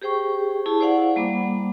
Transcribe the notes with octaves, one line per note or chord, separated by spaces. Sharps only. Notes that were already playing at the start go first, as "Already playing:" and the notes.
G4 G#4 C5 G5 C#6
E4 G#4 A5
E4 C5 D5 F5 F#5
G3 A#3 B5 D6